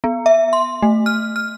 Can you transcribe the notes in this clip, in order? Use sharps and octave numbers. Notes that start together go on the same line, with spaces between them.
B3
E5
C6
A3
F6
F6